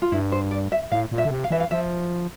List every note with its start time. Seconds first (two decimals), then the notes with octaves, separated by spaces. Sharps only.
0.02 F4
0.12 G2 E4
0.32 C5
0.51 D5
0.72 E5
0.92 A2 F5
1.11 A#2
1.18 E5
1.25 D3
1.31 C3
1.44 F5
1.51 E3 E5
1.60 F5
1.71 F3 E5